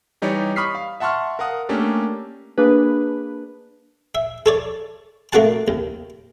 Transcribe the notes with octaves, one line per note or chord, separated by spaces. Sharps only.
E3 G3 D#4 G4 C#5 D5
B5 C#6 D#6 F6 B6 C7
F5
E5 F#5 A5 C6 C#6 F6
A#4 F5 F#5 D#6
A3 A#3 C#4 D4 G4 A4
A#3 D4 G#4 B4
E5
A4 C#5 D5
A3 A#3 D4 F#4 F#5 A5
D#2